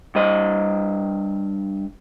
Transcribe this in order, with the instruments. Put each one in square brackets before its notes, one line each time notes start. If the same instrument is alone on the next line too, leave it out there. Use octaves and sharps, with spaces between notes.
[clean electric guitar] G2 D#5